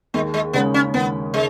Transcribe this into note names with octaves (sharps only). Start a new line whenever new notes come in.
D#2 G#3
G#3
C#3 G#3 B3 C#4
C#4
D#2 B3
C#3 G#3